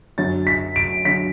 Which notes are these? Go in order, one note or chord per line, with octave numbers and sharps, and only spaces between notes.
F#2 D3 F#3 A6
B6
D7
D3 F#3 B6